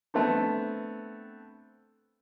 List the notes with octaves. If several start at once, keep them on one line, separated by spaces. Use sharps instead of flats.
A3 B3 C4 D4